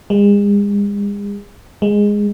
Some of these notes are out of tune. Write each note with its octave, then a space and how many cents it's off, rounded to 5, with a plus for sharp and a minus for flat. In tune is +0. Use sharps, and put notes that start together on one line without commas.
G#3 -40
G#3 -10